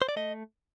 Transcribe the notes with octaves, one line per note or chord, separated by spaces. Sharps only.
C5
D5
A3 D#5